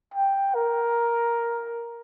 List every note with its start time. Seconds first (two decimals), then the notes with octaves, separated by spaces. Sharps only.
0.14 G5
0.55 A#4